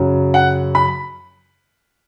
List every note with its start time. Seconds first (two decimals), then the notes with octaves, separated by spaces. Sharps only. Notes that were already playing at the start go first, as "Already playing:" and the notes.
Already playing: F#2 C#3 F#3
0.34 F#5
0.75 B5